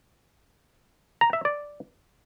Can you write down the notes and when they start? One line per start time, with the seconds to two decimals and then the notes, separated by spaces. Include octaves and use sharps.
1.21 A#5
1.33 E5
1.45 D5